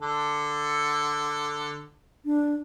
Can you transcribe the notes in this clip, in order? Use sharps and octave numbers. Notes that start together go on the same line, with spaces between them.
D3 A4
D4